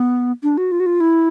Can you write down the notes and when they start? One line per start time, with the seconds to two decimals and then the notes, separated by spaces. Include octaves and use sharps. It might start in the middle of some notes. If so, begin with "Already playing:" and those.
Already playing: B3
0.43 D4
0.58 F#4
0.72 F4
0.80 F#4
0.86 F4
1.01 E4